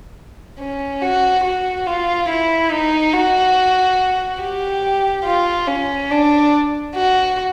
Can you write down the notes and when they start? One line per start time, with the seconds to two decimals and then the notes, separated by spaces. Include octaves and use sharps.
0.59 C#4
1.02 F#4
1.44 F#4
1.87 F4
2.29 E4
2.72 D#4
3.13 F#4
4.42 G4
5.25 F4
5.67 C#4
6.11 D4
6.96 F#4